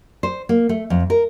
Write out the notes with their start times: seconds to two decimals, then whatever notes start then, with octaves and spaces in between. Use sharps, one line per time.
0.23 C5
0.49 A#3
0.69 A3
0.90 F2
1.10 A#4